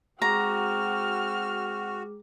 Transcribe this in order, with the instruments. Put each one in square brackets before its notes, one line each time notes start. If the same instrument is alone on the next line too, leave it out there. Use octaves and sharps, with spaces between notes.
[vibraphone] G#3 G#4 D6 [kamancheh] C4 F6 [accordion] F#4 [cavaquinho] A#5